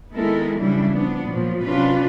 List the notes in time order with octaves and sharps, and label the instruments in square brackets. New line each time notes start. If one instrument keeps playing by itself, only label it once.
[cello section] D#3 G#3 B3 E4 A4 A#4
C#3 E3 F#3 G3 D4 E4
F3 B3 D4
A#2 F3 F#3
C3 F#3 C#4 D4 F4 B4